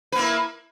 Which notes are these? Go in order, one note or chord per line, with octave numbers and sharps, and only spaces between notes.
A#3 E4 B4